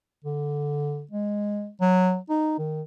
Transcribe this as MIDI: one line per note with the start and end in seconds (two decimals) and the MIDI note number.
0.24 1.04 50
1.11 1.69 56
1.81 2.18 54
2.29 2.55 63
2.59 2.82 51